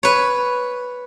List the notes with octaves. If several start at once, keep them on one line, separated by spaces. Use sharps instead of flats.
B4 C#5